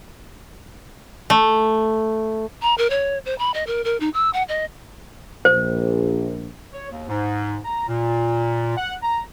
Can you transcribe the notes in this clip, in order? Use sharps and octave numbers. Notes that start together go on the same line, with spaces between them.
A3
A#5
A#4
C#5
C5
B5
D#5
A#4
A#4
D#4
E6
F#5
D#5
A#1 C5
C#5
D#2
G#2
A#5
A#2
F#5
A#5